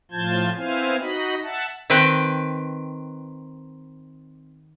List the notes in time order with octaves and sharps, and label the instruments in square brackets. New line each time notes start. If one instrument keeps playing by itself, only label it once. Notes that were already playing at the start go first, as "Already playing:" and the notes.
[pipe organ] A2 F3 F4 A5 G6 G#6
B3 C4 E4 C5 F5 G#5
D#4 F#4 D#5 B5
E5 F#5 A5
[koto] D#3 C4 B4 G5